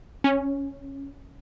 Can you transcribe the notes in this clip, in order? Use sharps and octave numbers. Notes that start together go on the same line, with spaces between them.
C#4